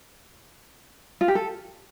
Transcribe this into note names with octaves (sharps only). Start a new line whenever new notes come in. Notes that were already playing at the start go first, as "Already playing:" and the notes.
F4
G4
A4